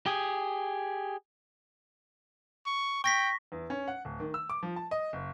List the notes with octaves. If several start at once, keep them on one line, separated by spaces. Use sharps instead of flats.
G4 G#4
C#6
G5 C#6 A#6 B6
E2
C#4
F#5
D1
D#3
E6
D6
F3
A5
D#5
F#1